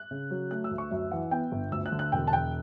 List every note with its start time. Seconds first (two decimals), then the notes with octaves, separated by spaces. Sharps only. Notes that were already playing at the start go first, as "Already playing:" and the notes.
Already playing: F#6
0.11 C#3
0.31 F#3
0.51 A3 F#6
0.64 E6
0.71 D2
0.78 C#6
0.91 F#2 E5
1.11 E3 F#5
1.31 B3 G5
1.52 G1
1.72 D2 E6
1.86 F#6
1.92 D3
1.99 F#6
2.12 E1 G5
2.27 A5
2.32 E1 G5